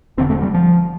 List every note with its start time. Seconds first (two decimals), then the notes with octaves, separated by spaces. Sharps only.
0.18 E1 E2 D3 C4
0.30 A3
0.42 G3
0.54 F3